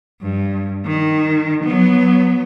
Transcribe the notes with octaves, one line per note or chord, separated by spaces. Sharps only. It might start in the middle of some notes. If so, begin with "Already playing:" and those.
G2
D#3
F#3 B3